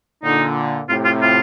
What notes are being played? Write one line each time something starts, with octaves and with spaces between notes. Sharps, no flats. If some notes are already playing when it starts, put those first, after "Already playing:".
A#2 D3 D#4
A2 C3 F4
F4
F4